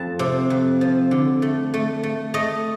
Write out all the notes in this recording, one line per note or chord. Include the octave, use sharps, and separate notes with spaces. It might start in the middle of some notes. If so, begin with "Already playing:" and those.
Already playing: F2 A5
C3
F2
F3
D3
A3
A3
A3
A3 D#5